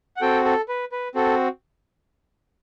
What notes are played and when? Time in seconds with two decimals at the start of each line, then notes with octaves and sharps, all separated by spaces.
0.16 F#5
0.21 C4 F#4 A4 G5
0.45 A4
0.68 B4
0.92 B4
1.15 C4 F#4 A4